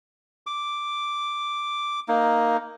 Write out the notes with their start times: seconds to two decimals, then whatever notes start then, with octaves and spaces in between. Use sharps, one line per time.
0.47 D6
2.08 A#3 D#4